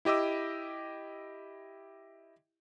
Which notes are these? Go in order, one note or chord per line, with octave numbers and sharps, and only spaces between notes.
E4 G4 D#5 D6 E6